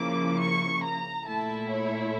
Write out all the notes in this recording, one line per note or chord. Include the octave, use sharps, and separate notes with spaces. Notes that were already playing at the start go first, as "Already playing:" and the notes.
Already playing: C#3 F3 A#3 E4 D6
C#6
A#5
A#2 A3 E4 A5
C#5